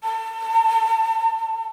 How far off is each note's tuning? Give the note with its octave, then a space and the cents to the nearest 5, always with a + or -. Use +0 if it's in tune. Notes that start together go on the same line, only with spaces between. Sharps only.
A5 +35